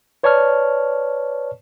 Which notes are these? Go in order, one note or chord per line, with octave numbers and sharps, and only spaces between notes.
B4 C#5 D5 A5 C#6 F6